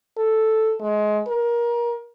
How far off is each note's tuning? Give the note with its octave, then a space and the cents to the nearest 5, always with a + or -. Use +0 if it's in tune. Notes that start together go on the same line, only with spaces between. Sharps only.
A4 +0
G#3 +25
A#4 +25